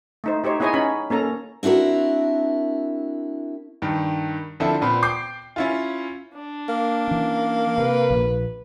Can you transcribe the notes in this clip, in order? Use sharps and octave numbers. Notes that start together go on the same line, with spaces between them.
A3 D#4 C5
D#4 G4 C5 C#5
B3 E4 G#4 C#5 D#5 G#5
C#4 D#4 B5
A#3 C#4 A4 A#5
C4 D4 E4 F#4 A#4
G2 D#3
D3 F3 C4 D4 E4 A4
A#2 B3 C4 B5
G5 D6 G6 C7
C#4 E4 F4
D4
A#3
E3 C#4
C3 B4
A#1